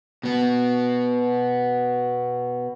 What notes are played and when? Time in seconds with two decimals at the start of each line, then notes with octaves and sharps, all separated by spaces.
0.23 B2 B3